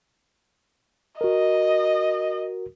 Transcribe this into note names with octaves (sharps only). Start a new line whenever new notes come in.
F#4 A#4 D#5